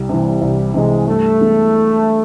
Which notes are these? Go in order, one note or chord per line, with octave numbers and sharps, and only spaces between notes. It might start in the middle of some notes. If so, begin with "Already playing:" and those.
Already playing: C2 G3
C3 E3
C2 G3
C3 E3 G#3
G2 A3
E3 G#3 B3